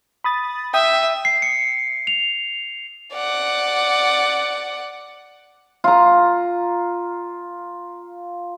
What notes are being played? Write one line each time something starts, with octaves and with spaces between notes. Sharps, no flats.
B5 D#6 A6
E5 G5 D#6
C7
C#7
F7
D5 F#5
F4 A#5